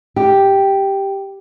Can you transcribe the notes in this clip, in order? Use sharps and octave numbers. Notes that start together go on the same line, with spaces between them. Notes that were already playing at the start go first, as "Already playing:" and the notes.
G4